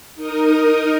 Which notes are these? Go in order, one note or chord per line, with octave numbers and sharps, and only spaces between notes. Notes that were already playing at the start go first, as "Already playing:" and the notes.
D#4 A#4 D#5